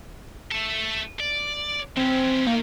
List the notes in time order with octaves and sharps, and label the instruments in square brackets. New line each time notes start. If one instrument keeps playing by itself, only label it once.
[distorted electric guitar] A3 A4
D5
[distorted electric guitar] E3 C#4 [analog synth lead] C4
[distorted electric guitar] D#3 D#4 [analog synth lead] A#3